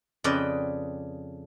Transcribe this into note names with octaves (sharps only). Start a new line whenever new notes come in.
F2 C#3 B4 D5 D#5 G5